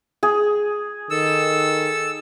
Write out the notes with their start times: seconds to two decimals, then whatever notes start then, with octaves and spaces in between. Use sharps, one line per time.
0.23 G#4
1.11 D#3 A4 E6